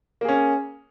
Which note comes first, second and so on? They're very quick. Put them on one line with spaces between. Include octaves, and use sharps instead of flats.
A#3 G#4 C#4